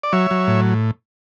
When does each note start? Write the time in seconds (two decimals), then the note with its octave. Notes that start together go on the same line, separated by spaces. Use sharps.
0.03 D5
0.13 F#3 C#5 E5
0.31 F#3
0.47 A2